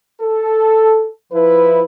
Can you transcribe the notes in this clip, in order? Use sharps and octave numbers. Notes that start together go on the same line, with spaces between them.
A4
F3 E4 B4